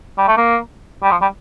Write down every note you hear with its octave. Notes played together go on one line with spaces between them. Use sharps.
G3
A3
A#3
G3
F3
G3